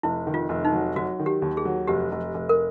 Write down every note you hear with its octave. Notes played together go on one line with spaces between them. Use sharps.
F1 E4
D#3
F4
F1
D#4
F#3
F#3 F#4
D#3
G4
D#2
G#4
F#3
F1 G4
F1
F1
A#4